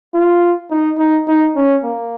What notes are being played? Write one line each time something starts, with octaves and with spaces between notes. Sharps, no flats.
F4
D#4
D#4
D#4
C#4
A#3